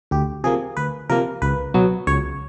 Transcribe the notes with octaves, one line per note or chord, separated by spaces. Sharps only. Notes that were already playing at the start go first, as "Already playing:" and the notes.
D2 G4
C3 F3 A#3 G#4
D2 B4
C3 F3 A#3 A#4
C#2 B4
B2 F#3 B3
C#2 C#5